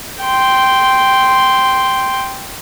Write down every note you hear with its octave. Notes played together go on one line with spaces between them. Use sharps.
G5 C6